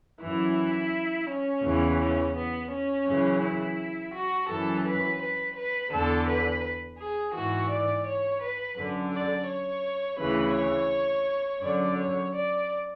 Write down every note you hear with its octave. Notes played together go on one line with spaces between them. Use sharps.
F#2 E3 E4
C#4
E2 C#3 E3
C#4
B3
C#4
F#2 C#3 E3
E4
F#4
F#2 E3 A4
B4
B4
B4
E2 D3 A4
B4
G#4
G#2 E3 F#4
D5
C#5
B4
F#2 D3
D5
C#5
D2 C#3 E3 B4
C#5
F#2 D3 D5
C#5
D5